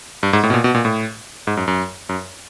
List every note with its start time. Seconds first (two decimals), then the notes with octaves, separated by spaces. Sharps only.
0.23 G2
0.33 G#2
0.43 A2
0.50 B2
0.54 A#2
0.64 B2
0.75 A#2
0.85 A2
1.47 G#2
1.57 F#2
1.68 F#2
2.09 F#2